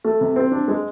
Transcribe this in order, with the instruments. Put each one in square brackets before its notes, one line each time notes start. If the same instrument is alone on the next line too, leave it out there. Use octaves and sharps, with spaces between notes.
[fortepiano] A3
C3
C4
D4
G#3